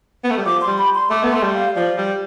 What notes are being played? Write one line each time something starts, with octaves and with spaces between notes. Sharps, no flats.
B3
A3
G3
F3 D6
C6
G3
B5
C6
A3 D6
B3
A3 C6
G3
F5
F3 D5
G3